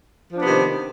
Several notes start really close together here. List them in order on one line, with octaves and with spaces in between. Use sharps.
F3 D4 B3 C3 D#3